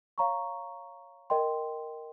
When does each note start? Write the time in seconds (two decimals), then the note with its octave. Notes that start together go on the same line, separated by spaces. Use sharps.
0.18 C#5 F5 A#5 C#6
1.30 A#4 D#5 G5 C6